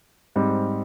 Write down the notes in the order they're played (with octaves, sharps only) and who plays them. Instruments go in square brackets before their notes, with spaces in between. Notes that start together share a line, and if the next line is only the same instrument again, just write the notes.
[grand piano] G#2 G3 C4